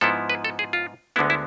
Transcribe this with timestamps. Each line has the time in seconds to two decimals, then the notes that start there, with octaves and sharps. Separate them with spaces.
0.01 G#2 F3 B3 E4 A4
0.30 B4
0.45 A4
0.59 G#4
0.73 F4
1.16 D2 D3 G#3 B3 E4
1.30 E4